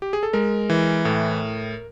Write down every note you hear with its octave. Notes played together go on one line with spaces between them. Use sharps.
G4
G#4
A4
G#3 A#4
E3
A2